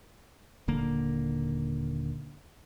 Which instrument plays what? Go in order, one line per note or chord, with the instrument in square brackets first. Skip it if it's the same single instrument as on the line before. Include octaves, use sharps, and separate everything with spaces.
[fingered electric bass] D#1 D3 A#3